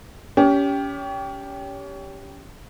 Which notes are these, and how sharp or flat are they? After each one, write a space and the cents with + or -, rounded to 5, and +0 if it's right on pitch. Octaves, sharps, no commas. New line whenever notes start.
C#4 +30 G4 +0